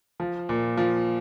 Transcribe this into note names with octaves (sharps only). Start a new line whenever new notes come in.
F3
A#2
F3